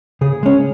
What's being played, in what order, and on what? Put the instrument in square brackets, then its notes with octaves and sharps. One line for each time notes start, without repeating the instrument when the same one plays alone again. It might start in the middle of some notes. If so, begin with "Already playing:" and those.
[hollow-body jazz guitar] C#3 G#4
G#3 C#4